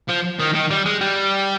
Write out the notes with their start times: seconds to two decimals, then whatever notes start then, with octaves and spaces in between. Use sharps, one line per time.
0.09 F3
0.40 D#3
0.55 D#3
0.70 G3
0.85 G#3
1.01 G3